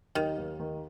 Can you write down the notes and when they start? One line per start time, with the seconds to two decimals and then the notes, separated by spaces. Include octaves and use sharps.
0.15 D#2 D#3
0.38 D#2
0.60 D#3